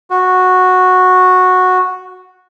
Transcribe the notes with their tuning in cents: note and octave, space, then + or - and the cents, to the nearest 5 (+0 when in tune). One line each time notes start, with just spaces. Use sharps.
F#4 -10